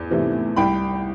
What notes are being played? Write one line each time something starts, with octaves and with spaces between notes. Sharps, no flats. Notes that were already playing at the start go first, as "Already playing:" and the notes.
Already playing: E2
C3 E3 A3
C2 G5 B5